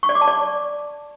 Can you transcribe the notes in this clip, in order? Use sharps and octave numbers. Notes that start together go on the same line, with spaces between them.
C#6
D5
D6
A5
D5